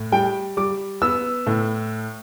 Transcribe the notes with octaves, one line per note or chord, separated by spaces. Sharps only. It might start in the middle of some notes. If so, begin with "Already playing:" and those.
Already playing: A2
G3 G5
G3 D6
B3 E6
A2